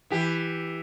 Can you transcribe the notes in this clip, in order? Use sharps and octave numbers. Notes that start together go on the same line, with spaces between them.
E3 G4